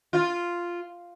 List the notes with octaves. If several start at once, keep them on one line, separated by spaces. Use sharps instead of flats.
F4